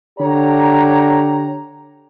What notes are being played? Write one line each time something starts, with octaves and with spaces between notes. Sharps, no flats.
D3 G4 C#5 A#5